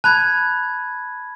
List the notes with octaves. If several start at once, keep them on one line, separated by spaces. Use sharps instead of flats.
A5 B5 F#6 G#6